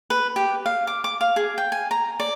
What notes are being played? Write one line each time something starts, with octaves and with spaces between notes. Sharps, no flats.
B4
G4
F5
D6
D6
F5
G#4
G5
G#5
A#5
D5